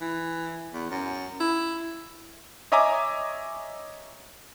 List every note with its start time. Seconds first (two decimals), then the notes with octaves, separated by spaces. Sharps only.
0.01 E3
0.72 E2
0.91 F#2
1.40 E4
2.72 C#5 D#5 E5 G#5 A#5 D6